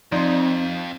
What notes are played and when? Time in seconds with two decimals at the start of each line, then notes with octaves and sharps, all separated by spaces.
0.12 F2 F3 C4 D#4 D5 C6